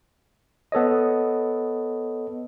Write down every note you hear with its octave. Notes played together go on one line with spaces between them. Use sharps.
B3 A4 C#5 D#5